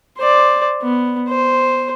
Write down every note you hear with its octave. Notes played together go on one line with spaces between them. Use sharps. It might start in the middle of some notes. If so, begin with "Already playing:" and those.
C5 D5
B3
C5